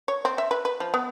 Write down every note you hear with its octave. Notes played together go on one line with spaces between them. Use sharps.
C#5
C4
E5
B4
B4
F3
B3